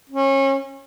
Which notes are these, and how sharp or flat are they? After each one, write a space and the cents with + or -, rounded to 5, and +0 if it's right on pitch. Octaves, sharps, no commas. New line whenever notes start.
C#4 -30